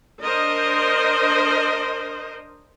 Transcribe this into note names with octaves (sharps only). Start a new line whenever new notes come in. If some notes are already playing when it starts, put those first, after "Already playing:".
D4 A#4 C5 D#5